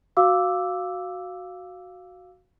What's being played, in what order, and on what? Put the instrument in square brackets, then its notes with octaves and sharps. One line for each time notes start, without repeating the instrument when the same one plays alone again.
[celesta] F#4 F5 D6 E6